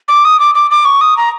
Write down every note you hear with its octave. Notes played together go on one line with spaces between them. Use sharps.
D6
D#6
D6
D6
D6
C#6
D#6
A#5